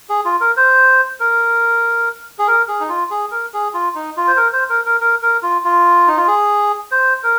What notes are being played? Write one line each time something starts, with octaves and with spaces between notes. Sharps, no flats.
G#4
F4
A#4
C5
A#4
G#4
A#4
G#4
D#4
F4
G#4
A#4
G#4
F4
D#4
F4
C5
A#4
C5
A#4
A#4
A#4
A#4
F4
F4
D#4
F4
G#4
C5
A#4